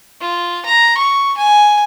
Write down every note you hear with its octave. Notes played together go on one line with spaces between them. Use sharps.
F4
A#5
C#6
G#5